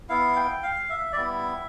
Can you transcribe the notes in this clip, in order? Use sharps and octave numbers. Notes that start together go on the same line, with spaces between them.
B3 E4 F5
G5
F5
E5
D5
G3 B3 E4 E5